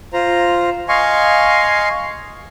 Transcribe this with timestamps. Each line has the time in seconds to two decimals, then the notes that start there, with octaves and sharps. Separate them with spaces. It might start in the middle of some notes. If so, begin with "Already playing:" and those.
0.13 F4 C5 A#5
0.89 D#5 F5 G#5 C6 C#6